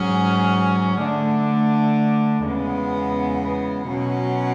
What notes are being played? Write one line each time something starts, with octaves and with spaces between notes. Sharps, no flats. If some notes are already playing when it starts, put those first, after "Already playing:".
Already playing: G#2 F#3 C#4 G#4
D3 A3 D4
E2 C#3 G#3 B3
B2 F#3 C#4